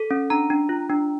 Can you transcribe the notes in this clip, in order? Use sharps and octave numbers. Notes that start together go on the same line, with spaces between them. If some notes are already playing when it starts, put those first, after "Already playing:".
Already playing: A4
C#4
D4 A#5
D4
F4
D4